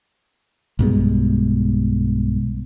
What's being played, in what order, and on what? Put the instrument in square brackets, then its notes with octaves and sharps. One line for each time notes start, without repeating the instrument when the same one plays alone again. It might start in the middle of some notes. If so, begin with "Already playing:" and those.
[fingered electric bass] B1 G2 B2 G#3